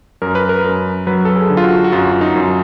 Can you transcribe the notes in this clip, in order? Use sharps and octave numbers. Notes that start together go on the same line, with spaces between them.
F#2 A#4
B4
A#4
F#2
F#3 B4
A4
G#4
D3
F4
F#4
F#4
F#2 F4
D#4
F#2